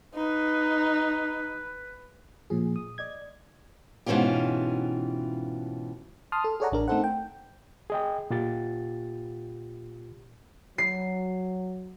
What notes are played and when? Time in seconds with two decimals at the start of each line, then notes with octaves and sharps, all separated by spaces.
0.15 D#4 B4
2.50 A#2 F3 G#4
2.76 D#6
2.98 D5 D#5 G#6
4.06 G#2 B2 E3 C#4 F4 G4
6.32 A5 C6 D#6 F6
6.44 A4
6.60 G#4 A4 C#5 D5 F#5 A#5
6.72 A1 D4 A#4
6.88 A3 C4 D#4 A4 C5 F#5
7.04 G5
7.90 G#4 D#5 G5
8.30 A#2 F4 G4 A6
10.78 F#3 C7